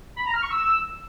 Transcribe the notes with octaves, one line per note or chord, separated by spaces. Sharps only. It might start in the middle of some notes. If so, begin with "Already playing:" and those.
B5
A#5
F6
C#6
E6